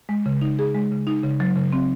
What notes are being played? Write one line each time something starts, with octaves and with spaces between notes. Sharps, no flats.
G#3
C#3
D#4
G#4
G#3
C#3
D#4
C#3
F#3
C#3
C4